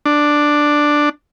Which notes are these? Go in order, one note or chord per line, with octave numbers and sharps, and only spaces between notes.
D4